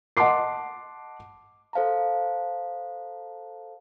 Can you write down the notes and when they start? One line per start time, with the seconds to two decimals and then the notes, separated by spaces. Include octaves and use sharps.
0.17 D#5 F#5 A5 C6 D6 C7
1.73 A4 C5 F5 A5 A#5